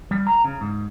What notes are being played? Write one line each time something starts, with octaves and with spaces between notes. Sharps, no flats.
G3
A#5
C#3
G#2